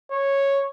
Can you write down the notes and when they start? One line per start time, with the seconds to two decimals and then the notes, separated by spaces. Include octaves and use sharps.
0.11 C#5